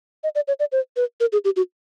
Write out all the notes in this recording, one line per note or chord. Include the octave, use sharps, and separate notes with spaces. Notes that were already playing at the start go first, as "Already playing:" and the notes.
D#5
D5
C#5
D5
C5
B4
A#4
G#4
G4
F#4